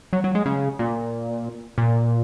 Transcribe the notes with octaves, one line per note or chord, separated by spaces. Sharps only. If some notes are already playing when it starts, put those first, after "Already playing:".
F#3
F#3
G#3
C#3
A#2
A#2